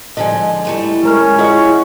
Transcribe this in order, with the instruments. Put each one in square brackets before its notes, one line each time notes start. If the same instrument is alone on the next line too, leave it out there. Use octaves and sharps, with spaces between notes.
[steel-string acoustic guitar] D3 F3 G#3 [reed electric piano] D#5 G#5
[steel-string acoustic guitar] G3 A3 E4
[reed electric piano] G#3 A#4 F6 [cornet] C#4
[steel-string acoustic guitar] E4 E5 F#5 [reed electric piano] F4 G#4 D#5